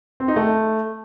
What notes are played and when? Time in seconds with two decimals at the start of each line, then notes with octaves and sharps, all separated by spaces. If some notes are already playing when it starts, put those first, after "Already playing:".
0.20 C4
0.28 D#4
0.36 A3